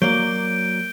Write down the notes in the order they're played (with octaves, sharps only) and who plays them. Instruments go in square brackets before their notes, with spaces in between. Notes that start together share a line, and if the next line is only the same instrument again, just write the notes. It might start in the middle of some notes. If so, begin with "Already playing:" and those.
[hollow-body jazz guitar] F#3 A#3 D5 [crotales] G6 D7 G7